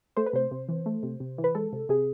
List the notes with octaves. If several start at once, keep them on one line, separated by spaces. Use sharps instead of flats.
A3 C5
B4
C3 C5
C3
E3
A3
C3
C3
E3
B4
G#3 A4
C3
C3 G#4